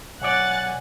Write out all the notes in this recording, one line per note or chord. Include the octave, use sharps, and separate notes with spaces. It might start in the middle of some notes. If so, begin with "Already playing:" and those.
B1 C#5 D5 F#5 G#5 F#6 A6